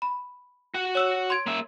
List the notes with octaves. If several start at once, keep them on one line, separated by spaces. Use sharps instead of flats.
B5
F#4 F#5
C#5 E6 E7
C6 G#6 D7
A#3 E5